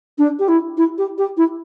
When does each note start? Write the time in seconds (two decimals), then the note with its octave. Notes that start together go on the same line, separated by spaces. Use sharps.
0.18 D4
0.39 G4
0.48 E4
0.77 E4
0.98 G4
1.18 G4
1.37 E4